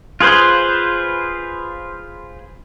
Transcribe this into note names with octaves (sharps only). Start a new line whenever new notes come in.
F4 G#4 B4 C5